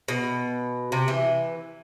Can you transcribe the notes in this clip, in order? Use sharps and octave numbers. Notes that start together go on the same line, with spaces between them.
B2
C3
E3